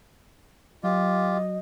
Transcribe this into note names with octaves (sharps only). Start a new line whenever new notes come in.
F#3 F4 G4 D#5